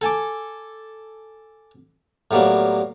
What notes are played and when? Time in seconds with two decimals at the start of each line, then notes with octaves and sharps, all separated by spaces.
0.01 A4 G#5 A5 D6
2.31 A2 F#3 G3 A#3 B3